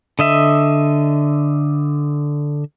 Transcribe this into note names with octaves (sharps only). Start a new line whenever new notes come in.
D3 D#5 E5